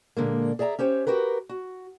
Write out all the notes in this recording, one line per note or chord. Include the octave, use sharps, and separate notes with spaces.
A#2 D3 G#3 A#3
G#4 D5 E5 A5 A#5
C#4 G4 C5 C#5
F#4 G4 A#4 B4
F#4